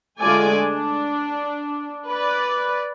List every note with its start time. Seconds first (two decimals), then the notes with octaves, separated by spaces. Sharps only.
0.21 D3 G#3 A3 F4 D5 G#5
0.56 D4
2.09 B4 D5